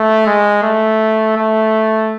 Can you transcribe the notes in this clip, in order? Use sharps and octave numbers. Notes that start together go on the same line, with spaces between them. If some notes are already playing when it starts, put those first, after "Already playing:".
Already playing: A3
G#3
A3
A3